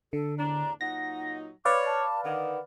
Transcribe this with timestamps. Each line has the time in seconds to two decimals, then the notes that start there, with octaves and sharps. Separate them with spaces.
0.13 D3 A4
0.38 E2 A2 D4 A#5
0.81 A#2 F#3 D#4 F#5 A#6
1.65 B4 C#5 D5 F5 D6
1.86 A5
2.24 D3 D#3 F#5